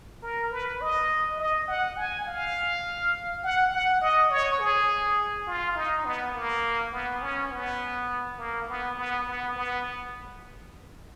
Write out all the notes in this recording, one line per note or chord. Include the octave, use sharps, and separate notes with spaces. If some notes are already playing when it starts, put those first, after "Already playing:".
A#4
B4
D#5
D#5
F#5
G#5
F5
F#5
F#5
D#5
C#5
G#4
F4
D#4
B3
A#3
B3
C#4
B3
A#3
B3
B3
B3
B3